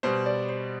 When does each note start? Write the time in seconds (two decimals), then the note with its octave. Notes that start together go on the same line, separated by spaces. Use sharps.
0.03 B2 G3 C5
0.26 D5
0.49 C5